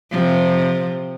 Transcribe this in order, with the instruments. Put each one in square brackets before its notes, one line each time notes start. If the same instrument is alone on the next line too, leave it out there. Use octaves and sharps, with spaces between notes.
[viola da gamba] C3 F3